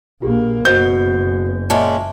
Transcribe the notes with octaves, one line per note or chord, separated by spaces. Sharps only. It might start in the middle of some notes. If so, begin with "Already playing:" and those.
A#1 A#3 F4 G4 G#4
F#1 B2 C5 G6
A#2 G#3 C#4 E5 A5